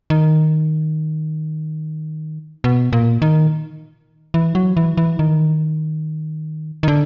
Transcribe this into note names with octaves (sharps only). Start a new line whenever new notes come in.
D#3
B2
A#2
D#3
E3
F#3
E3
E3
D#3
D#3
D3